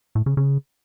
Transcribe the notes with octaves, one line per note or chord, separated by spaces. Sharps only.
A2
C#3
C#3